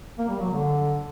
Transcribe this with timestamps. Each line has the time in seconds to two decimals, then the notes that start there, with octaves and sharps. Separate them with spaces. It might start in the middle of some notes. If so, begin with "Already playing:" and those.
0.19 A#3
0.29 G3
0.40 F#3
0.51 D3